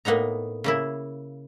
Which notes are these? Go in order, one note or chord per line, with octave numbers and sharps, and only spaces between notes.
A2 A#3 B3 D#4 A#5
C#3 A#3 E4